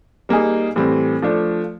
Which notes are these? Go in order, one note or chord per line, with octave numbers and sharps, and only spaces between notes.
G3 A#3 D#4 G#4
A2 E3 G3 C4
F3 A3 D4